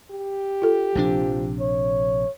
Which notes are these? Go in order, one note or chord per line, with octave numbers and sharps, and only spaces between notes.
G4
F4 A4
A#1 C3 F3 D4
C#5